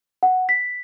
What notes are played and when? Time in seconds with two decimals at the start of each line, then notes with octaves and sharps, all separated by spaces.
0.23 F#5
0.49 B6